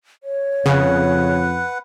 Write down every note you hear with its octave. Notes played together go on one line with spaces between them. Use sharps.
C#5
F2 C#3 B4 F#5